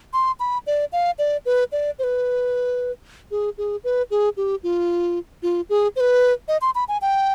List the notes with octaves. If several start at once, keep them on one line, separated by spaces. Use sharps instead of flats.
C6
B5
D5
F5
D5
B4
D5
C5
B4
G#4
G#4
B4
G#4
G4
F4
F4
G#4
C5
B4
D#5
C6
B5
G#5
G5